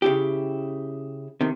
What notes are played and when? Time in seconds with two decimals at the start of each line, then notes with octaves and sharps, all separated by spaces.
0.02 C#3 E4 G4
1.41 C3 D#3